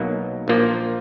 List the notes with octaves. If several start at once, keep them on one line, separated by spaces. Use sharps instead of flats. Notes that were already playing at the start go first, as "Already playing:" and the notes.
Already playing: B1 B2 F#3 A#3 D#4
A#1 A#2 F3 A#3